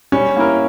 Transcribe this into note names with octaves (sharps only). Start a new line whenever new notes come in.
G3 C#4
A#3 E4 A#4